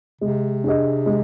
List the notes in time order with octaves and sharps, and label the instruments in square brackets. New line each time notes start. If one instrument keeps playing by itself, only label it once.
[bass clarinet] C3 [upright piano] G#3
[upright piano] D4 G#4 D#5
G#3